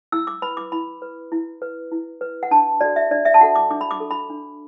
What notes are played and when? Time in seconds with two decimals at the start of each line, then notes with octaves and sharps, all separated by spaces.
0.12 E4 E6
0.27 D6
0.42 B4 B5
0.57 D6
0.72 E4 B5
1.02 B4
1.32 E4
1.62 B4
1.92 E4
2.21 B4
2.43 F#5
2.51 D4 A5
2.81 F#4 A4 D5
2.96 E5
3.11 D4 D5
3.25 E5
3.34 A5
3.41 F#4 A4 F#5
3.56 D6
3.71 D4 D6
3.81 B5
3.91 D6
4.00 A4
4.11 B5
4.30 D4